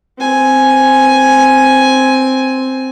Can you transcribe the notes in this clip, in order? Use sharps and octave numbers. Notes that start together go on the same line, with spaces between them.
C4 G#5